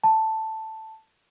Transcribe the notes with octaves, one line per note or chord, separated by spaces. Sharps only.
A5